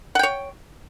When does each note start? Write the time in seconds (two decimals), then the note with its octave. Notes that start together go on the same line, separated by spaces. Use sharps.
0.15 F#5
0.19 G5
0.23 C#5